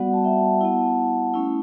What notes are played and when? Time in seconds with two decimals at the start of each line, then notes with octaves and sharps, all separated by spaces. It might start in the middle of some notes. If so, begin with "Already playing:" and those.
Already playing: G3 B3 F#4 D5 F#5
0.13 A5
0.24 E5 G5
0.61 B3 E4 F#5 A5
1.34 A3 C#4 E4